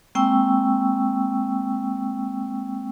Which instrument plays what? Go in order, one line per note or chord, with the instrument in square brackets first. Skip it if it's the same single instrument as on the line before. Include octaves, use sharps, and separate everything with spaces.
[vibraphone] G#3 A#3 C4 G5 C#6 E6